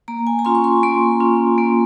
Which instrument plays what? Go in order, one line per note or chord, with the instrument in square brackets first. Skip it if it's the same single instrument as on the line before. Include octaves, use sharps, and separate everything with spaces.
[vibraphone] A#3 A#5
G#5
A#5
C#4 F4 C6
C#6
C6
A#3 C6
C#4 F4
A#3